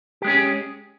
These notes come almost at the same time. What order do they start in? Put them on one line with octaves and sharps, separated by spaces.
G4 G#3 C#4 G#4